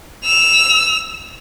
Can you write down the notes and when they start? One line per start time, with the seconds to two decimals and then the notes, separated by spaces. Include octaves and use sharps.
0.25 E6 F7